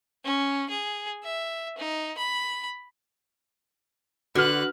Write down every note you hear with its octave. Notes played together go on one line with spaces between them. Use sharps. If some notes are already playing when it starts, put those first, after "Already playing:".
C#4
G#4
E5
D#4
B5
D3 F#4 B4 F6 F#6